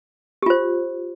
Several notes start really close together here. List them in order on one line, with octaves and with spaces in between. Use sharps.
G4 F4 C5